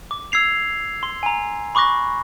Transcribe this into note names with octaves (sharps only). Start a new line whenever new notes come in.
D6
E6 G#6 C7 F7
C6
G#5 A#5
B5 C#6 D6 F#6 A#6